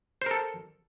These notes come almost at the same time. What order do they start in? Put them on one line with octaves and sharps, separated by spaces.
C5 A#4 A4